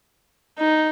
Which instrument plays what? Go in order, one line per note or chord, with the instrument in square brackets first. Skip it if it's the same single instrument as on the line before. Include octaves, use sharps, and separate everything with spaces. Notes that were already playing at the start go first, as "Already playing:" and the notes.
[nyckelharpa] D#4